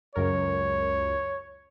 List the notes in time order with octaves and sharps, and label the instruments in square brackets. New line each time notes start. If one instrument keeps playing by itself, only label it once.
[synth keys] C#2 F#2 A#4 [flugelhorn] C#5